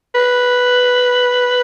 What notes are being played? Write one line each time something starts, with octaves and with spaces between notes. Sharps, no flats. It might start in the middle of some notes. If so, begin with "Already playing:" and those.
B4